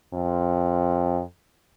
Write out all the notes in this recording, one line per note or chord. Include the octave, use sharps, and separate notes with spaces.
F2